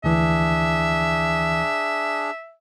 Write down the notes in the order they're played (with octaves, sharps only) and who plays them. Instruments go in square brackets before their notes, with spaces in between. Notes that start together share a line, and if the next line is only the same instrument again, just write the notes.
[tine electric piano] D2 E3 [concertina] D4 G#4 [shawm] E5